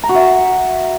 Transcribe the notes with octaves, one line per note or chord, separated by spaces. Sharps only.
A#5
F#4
E5